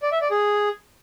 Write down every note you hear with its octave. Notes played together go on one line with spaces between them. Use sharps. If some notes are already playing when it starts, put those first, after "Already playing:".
D5
E5
D5
G#4